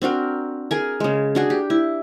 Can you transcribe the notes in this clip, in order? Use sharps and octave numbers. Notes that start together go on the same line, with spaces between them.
C4 D4 F#4 A#4
G#4 A#4 G#5
C#3 G#3
D4 F#4 G#4
G4
E4